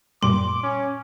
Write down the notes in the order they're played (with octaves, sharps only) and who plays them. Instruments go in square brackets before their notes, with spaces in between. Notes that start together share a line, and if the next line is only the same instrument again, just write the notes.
[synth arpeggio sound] F#2 A#2 G3 [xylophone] C6 [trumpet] D6
[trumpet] C#4